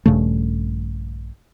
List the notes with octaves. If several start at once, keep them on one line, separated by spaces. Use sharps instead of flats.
A#1 G2 C#3 A3